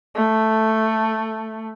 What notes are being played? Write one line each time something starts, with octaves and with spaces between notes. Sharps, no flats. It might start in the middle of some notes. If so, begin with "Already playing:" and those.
A3